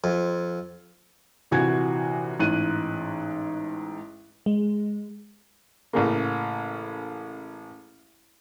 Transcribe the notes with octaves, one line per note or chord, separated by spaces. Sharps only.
F2
A#1 C3 E3 F#4 G#5 G#6
A1 G#2 F#6 D#7
G#3
A1 C#3 A#3